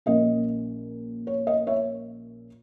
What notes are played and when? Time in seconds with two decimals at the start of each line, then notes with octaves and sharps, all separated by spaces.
0.06 A#1 A#2 A#3 C#4 D#5
1.27 C#5
1.47 D#5
1.67 C#5 E5